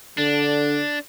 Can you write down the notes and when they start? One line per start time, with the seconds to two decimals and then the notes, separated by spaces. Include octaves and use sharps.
0.18 D3 D4